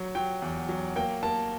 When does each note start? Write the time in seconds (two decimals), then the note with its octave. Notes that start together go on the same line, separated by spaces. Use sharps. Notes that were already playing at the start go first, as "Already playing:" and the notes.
Already playing: F#3
0.15 F#3 G5
0.42 E2
0.69 F#3
0.96 A#3 G5
1.23 A#3 A5